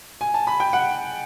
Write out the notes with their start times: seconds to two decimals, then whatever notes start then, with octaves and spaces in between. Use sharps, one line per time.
0.21 G#5
0.34 A5
0.47 B5
0.60 G5
0.73 F#5